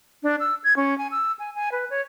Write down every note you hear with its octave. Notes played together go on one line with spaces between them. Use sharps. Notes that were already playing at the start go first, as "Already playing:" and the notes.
D4
E6
G#6
C#4
G#5
E6
G#5
G#5
B4
C#5